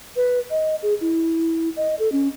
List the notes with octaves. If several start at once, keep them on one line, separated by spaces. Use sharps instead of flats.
B4
D#5
G#4
E4
D#5
A4
C#4